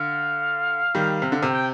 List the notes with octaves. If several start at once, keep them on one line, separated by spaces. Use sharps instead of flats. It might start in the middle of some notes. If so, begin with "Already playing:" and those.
Already playing: D3 F5
D#3 G3
C3
D3
C3
G5